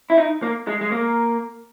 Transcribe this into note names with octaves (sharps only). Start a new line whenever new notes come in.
E4
D#4
A#3
G#3
G#3
A#3